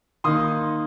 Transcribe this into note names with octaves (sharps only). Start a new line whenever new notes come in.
D#3 A#3 D#4 C6 D#6